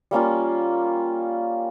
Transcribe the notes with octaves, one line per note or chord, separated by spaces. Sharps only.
G3 A#3 C#4 F4